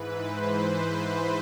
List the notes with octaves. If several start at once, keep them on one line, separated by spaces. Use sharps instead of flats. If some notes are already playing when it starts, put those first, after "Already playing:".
Already playing: G#2 E3 B4
C5